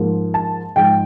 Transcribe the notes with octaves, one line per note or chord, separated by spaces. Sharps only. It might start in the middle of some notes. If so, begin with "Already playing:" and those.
Already playing: G#2 F3 A#3
A5
G#2 F3 G#3 G5